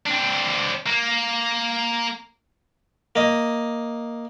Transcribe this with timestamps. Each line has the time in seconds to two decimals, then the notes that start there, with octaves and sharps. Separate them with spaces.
0.06 C4 D4
0.86 A#3
3.16 A#3 D#5